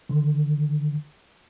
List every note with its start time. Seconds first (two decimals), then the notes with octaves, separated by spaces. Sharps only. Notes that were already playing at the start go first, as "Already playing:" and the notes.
0.09 D3 D#3